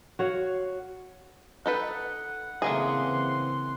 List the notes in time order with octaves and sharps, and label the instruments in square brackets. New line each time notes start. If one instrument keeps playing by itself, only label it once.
[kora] F#4 C#5 F5
[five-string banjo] D#4 A4 B4 [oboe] F#5
[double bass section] C#3 E3 C4 [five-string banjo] A3 A#3 G#4 [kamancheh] C6